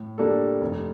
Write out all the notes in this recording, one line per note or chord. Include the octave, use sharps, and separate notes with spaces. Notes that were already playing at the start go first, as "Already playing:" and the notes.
Already playing: A2
G3 A#3 D4 A4
F1